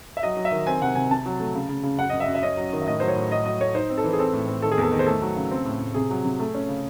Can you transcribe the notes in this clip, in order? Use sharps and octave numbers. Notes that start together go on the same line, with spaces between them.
E5
F#3 D#5
F#3
E5
D#3
C4 G#5
C3 F#5
C3 G#5
C3 A5
F#3
A3
C#3
C#3
C#3
F#2 F#5
F#2 D#5
E5
F#2
E5
C#4 D#5
F#3
D#3
E5
A2 D#5
F#3 C5
C#5
A2
F#3 D#5
F#3 D#5
A3 C#5
D#4 C5
C4
A4
E3
G#4
C4 A4
A2
C4
D#3 A4
G#4
E2 A4
D#3
C5
A3 A4
F#3
C#3
C4
A2
A2
C3 G#4
F#3
C3
A3
C#4
C#3